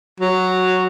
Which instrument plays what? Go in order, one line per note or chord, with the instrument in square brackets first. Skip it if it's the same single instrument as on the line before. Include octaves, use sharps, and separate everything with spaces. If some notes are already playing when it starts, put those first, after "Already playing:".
[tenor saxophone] F#3